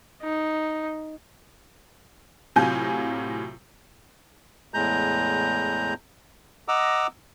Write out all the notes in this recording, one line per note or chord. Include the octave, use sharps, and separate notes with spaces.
D#4
A2 C3 F#3 F4 G#5 G6
E2 A2 G#3 A#5 G6
D#5 F#5 A#5 D6 E6